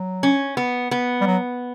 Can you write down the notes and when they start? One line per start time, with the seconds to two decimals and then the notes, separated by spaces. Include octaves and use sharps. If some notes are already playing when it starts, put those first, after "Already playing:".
Already playing: F#3
0.23 C#4
0.57 B3
0.91 B3
1.21 G3
1.27 F#3